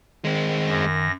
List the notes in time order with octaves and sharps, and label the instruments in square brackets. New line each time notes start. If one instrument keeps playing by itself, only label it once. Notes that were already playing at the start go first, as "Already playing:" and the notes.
[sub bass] D#3 [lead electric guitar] G#3 C4
[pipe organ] F#2 A#6